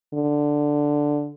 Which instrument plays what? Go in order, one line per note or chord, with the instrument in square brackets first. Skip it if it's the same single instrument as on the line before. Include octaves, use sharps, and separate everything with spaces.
[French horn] D3